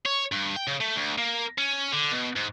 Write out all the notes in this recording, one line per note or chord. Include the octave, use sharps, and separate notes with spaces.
C#5
G2
G5
C#3
A3
D2
A#3
C#4
D3
B2
G#2